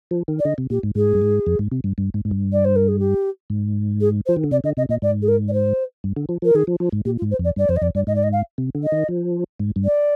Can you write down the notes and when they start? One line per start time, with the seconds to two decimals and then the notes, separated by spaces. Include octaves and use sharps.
0.11 F3
0.28 D#3
0.39 D5
0.45 D3 D#5
0.58 C3
0.70 A#2 G4
0.83 G#2
0.95 G#2 G#4
1.15 G2
1.22 G#2
1.47 F2
1.59 G#2
1.72 C3
1.84 G2
1.98 G2
2.14 G#2
2.25 G#2
2.31 G2
2.52 D5
2.64 C5
2.75 A#4
2.88 G#4
2.99 G4
3.50 G#2
4.00 G#4
4.26 C5
4.29 F3
4.36 D#3
4.44 D3
4.51 C3 D5
4.64 D3 D#5
4.77 C3 D#5
4.89 A#2 D#5
5.02 G#2 D5
5.22 G#4
5.28 A#4
5.48 D5
5.53 C5
6.04 G2
6.16 D3
6.29 F3
6.42 F3 A#4
6.55 D#3 G#4
6.67 F3
6.80 F3
6.93 G#2
7.05 A#2 G4
7.18 F4
7.22 G#2
7.31 C5
7.39 F2 D5
7.56 G2 D5
7.69 F2 C5
7.76 D#5
7.82 F2 D5
7.95 G2 D5
8.07 G#2 D#5
8.15 D5
8.23 D#5
8.32 F5
8.58 C3
8.75 D3
8.83 D#5
8.92 D#3
9.08 F3
9.60 G#2
9.76 G2
9.84 D5